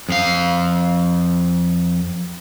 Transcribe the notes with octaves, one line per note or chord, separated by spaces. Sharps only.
F2 F5